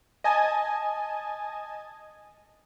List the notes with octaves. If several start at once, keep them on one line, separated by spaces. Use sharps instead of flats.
D#5 G#5 A5